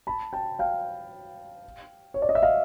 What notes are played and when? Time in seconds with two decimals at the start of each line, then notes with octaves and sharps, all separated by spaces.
0.07 A5 B5
0.33 G5 A5
0.59 F5 G5
2.14 C#5
2.22 D5
2.29 D#5
2.35 E5
2.42 D#5 F5